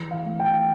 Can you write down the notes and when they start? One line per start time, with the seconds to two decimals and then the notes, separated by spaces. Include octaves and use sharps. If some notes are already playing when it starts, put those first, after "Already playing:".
Already playing: E3
0.11 F5
0.25 A3
0.40 G5